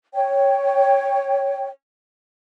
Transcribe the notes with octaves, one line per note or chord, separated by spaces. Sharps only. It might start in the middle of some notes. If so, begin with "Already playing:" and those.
C#5 G5